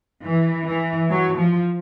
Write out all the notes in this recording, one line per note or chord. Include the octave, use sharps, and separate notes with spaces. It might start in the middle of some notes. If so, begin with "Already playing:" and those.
E3
E3
F#3
F3